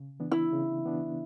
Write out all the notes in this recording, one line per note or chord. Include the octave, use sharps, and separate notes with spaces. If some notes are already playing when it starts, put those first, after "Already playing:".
Already playing: C#3
E3 B3 D4
E4
C#3
E3 B3 D4